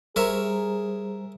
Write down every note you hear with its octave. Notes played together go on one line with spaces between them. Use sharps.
G3 G#4 A#4 C5 C#5 E5 A#5